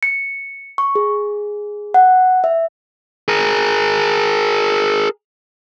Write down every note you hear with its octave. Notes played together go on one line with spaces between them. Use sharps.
C#7
C#6
G#4
F#5
E5
G#4 A#4